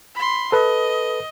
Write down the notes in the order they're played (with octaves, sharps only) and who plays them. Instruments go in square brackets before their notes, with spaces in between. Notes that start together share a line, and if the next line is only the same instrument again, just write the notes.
[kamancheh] B5 C6
[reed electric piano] A4 B4 [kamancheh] D#5